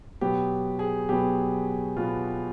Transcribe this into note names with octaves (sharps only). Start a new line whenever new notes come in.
B2 F#3 B3 G4
G#4
B2 F#3 B3 G4
B2 F#3 B3 F4